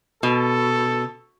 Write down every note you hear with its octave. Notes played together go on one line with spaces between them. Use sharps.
B2 A4